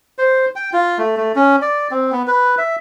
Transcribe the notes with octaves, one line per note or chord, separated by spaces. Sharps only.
C5
G5
F4
A3
A3
C#4
D5
C4
B3
B4
E5